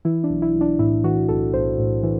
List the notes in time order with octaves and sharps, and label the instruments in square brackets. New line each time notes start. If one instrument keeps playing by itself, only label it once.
[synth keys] E3 E4
D4
B1
E4
B1
D4
A2 E4
E3 F#4
B1 A4
B1 C5
A2
E3